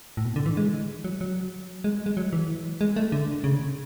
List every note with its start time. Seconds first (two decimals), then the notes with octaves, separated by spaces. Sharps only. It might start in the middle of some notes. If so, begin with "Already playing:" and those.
0.17 A2
0.25 B2
0.36 D3
0.46 E3
0.57 G#3
1.04 F#3
1.21 F#3
1.84 G#3
2.06 G#3
2.17 F#3
2.33 E3
2.81 G#3
2.96 A3
3.12 D3
3.44 C#3